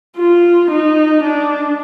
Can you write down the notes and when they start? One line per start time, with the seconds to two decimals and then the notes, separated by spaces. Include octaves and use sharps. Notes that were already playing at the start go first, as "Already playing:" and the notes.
0.17 F4
0.71 D#4
1.24 D4